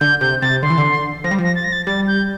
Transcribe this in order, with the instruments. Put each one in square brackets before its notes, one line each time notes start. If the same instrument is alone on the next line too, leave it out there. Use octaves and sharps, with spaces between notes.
[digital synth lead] D3 [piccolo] G6
[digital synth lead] C3 [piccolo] G6
[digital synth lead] C3 [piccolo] A6
[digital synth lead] D3 [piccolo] C6
[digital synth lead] E3
D3
[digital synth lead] F3 [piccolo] A#6
[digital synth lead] G3
F3
[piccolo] A#6
A6
A#6
A6
[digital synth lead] G3 [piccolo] A6
[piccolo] G6